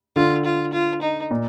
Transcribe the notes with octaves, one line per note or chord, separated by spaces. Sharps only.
D3 F4
F4
F4
D#4
A#2